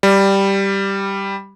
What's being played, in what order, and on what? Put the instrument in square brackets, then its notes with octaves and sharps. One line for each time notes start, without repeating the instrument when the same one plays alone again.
[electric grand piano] G3